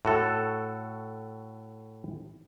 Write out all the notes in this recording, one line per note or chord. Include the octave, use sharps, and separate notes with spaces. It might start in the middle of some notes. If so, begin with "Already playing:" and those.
A2 F#4 A4